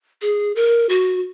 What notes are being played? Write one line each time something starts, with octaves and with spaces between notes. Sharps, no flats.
G#4
A#4
F#4